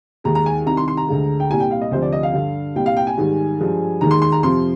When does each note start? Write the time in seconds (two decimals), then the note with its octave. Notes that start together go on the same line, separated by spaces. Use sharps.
0.24 D#2 D#3 G#3 A#5
0.35 A#5
0.46 G#5
0.66 C2 C3 D#3 A#5
0.77 C6
0.88 C6
0.97 A#5
1.08 D2 D3 G#3
1.40 G5
1.50 C2 A#2 G3 G#5
1.60 G5
1.71 F5
1.81 D#5
1.91 D2 C3 F3 C5
2.02 D5
2.13 D#5
2.23 F5
2.34 G2 D3 G3
2.76 C2 A#2 G3 G5
2.86 F5
2.97 G5
3.07 G#5
3.18 G#2 D#3 G3
3.59 G2 F3 G#3
4.01 D#2 D#3 G#3 A#5
4.11 C6
4.22 C6
4.32 A#5
4.43 F2 C3 F3 C6